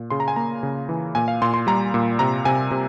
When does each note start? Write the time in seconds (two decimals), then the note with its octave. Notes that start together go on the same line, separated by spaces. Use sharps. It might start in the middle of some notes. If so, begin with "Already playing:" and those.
Already playing: A#2
0.10 C#3 C6
0.20 A#5
0.28 G#5
0.36 A#3 A#5
0.63 C#3
0.89 E3
1.15 A#2 G#5
1.28 F5
1.42 A#2 C6
1.54 C6
1.67 G3 A#5
1.94 A#2
2.19 C3 A#5
2.45 C3 G#5
2.71 C3